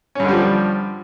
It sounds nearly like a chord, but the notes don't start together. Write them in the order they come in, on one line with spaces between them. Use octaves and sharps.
C#4 G2 D3 G3 F3